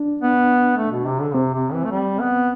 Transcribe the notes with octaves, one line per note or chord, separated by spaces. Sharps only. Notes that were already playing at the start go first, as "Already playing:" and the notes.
Already playing: D4
B3
A3
B2
C3
D3
C3 C4
C3
E3
A3
G3
B3